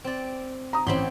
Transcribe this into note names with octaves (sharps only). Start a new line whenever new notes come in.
C4 D5
A#5 D#6
A1 C4 B5 C6